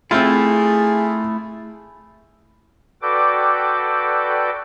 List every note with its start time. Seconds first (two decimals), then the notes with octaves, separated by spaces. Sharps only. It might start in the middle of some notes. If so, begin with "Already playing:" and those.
0.11 A3 C4 E4 F4 G#4
3.02 F#4 A4 B4 D5 G5 D6